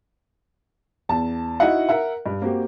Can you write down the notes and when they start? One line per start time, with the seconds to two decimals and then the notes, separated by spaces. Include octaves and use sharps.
1.09 E2 A5
1.60 D#4 E4 F#4 D#5 F#5
1.89 A#4 E5 F#5
2.26 G2
2.42 A#3 C4 F#4 G4